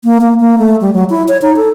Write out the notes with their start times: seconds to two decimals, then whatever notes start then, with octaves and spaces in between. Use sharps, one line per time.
0.04 A#3
0.21 A#3
0.40 A#3
0.58 A3
0.81 G3
0.93 F#3
1.10 E4
1.28 C#5
1.42 D#4
1.56 A4